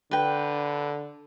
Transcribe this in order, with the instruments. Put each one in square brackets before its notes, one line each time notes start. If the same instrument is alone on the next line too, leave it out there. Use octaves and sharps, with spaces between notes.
[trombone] D3 [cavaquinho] B4 G5